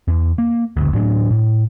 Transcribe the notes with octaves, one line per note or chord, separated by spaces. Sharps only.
E2
A#3
F#1 D2
A1 A2 F#3 D4
A2